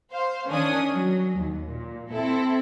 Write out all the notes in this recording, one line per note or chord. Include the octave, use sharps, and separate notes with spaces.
C5 F5
D#3 C#4 D4 D#6
F#3
D#2
A#2
C4 E4 A4